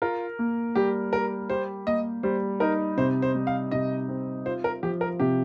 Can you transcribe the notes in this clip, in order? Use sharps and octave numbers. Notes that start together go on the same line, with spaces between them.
F4 A#4
A#3
G3 G4
G4 A#4
G4 C5
A#3 D#5
G3 C5
D#4 A#4
C3 C5
C5
G3
F5
C3 D#5
C4
F4 C5
A#4
F3 G4
A#4
C3 G4